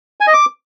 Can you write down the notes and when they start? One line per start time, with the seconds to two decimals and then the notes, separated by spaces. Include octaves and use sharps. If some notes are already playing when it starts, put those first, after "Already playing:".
0.21 G#5
0.27 D#5
0.34 D6